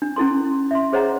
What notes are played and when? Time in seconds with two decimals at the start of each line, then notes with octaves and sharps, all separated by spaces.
0.02 D4
0.16 C#4 E4 A4 C6
0.71 E5 C6
0.93 G#4 C5 C#5 D#5 F#5 A#5